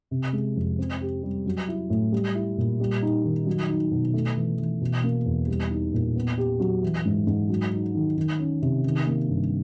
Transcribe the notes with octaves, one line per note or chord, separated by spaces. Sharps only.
C3
G#3
F2
C4
G4
G3
F#3
E4
A2
G3
E4
A#2
G3
D#4
D#3
F#3
D#4
B2
A3
E3
E3
B2
A#3
E2
G3
D#4
A#2
B3
G4
F#3
E3
G#2
G#2
F#3
D#4
D#3
D#3
C#4
C3
D#3
A#3
G2